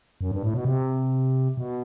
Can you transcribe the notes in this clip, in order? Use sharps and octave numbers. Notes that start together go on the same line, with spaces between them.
F#2
G2
A2
B2
C3
B2